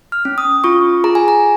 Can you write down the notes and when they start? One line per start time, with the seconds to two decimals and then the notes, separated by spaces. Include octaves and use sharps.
0.12 F6
0.25 C#4
0.38 D#6
0.64 F4 C#6
1.04 G#4 A#5
1.15 G#5
1.28 A#5